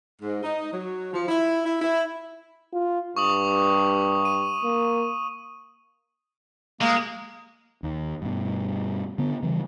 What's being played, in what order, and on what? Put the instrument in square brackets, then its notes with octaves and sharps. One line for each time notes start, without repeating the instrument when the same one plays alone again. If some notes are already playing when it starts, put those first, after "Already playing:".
[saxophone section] G#2
D#4
F#3
F3
E4
E4
E4
[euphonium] F4
[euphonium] G2 [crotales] C#6 D#6 F#7
[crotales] D#7
[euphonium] A#3
[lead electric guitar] G#3 [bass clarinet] A#3
[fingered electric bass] D#2
G2 B2
D3 B3
C#3 E3 G3